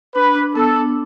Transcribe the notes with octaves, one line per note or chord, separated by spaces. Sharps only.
D4 B4
D4
B3 A4
D4